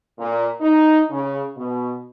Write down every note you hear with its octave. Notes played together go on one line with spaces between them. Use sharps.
A#2
D#4
C#3
B2